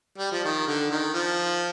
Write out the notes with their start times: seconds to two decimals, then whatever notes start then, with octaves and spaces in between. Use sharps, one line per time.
0.18 G3
0.32 F3
0.44 D#3
0.67 D3
0.91 D#3
1.14 F3